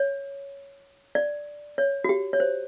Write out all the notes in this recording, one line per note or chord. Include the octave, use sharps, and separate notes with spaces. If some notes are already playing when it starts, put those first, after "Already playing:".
Already playing: C#5
D5
C#5
F#4
G4
C#5
C5